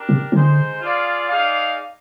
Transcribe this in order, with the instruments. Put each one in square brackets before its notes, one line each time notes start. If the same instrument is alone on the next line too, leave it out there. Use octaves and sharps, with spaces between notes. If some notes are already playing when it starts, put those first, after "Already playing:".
Already playing: [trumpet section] D4 G4 A#4
[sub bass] C3
[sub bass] D3 [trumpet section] G#3 D#4 G#4 C5
[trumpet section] F4 G#4 D5 F5
D#4 G#4 D5 F5